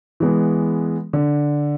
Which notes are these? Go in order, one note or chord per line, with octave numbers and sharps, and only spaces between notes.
E3 G#3 B3
D3